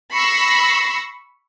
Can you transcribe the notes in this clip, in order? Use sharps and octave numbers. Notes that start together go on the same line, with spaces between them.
B5 C#6 E6 A#6 C7